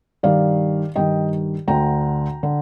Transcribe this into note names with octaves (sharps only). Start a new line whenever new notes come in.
G2 D#3 D5 F5
G2 D#3 D#5 G5
D2 D3 G5 A#5
D3